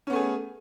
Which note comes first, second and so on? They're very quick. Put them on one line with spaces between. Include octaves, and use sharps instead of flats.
C#4 B3 A3 G#4